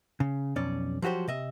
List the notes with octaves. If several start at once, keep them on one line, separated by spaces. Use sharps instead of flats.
C#3
B1 F2 C#4 D5
F3 F#3 F#4 G4 C5
C3 D#5 E5